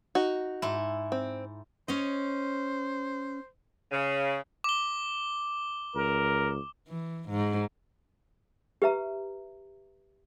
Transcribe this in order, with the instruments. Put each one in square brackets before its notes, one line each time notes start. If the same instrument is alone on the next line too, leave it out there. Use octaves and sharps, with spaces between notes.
[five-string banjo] D#4 F#4
[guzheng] G#2 E4
[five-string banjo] C4
[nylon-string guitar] C#4 C#5 D#5 [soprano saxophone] C5
[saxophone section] C#3
[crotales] D6 G7
[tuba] C#2 [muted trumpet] A#4
[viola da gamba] E3
G#2
[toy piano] G4 B4 E5 A#5